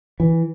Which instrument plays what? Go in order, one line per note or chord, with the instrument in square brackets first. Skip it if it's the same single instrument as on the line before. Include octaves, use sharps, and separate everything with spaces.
[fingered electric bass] E3